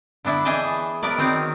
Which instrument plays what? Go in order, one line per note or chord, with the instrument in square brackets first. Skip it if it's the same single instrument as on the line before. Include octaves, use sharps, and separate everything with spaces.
[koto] D3 B3 D4 E4
E3 G#4 D#5 E5 G5 A5
F#3 B3 A#4 D5
D#3 F#3 C4 D#4